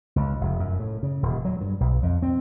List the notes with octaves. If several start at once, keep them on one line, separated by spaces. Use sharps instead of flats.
C#2
F1
F#2
A2
C#3
D#1
F#3
G2
B1
F2
C4